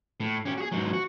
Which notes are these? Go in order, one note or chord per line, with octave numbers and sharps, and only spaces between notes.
A2
C#4 G4
F#4 G#4
G#2 F#3
F#4